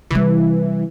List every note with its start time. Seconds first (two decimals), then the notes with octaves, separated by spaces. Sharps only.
0.11 C3 E3 G3